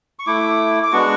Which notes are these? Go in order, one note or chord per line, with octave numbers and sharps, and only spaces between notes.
C#6
A3 E4 D6
D6
G#3 B3 D4 F#4 C#6